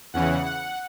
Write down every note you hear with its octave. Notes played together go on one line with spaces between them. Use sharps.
E2 C#3 E3 F#5
F#5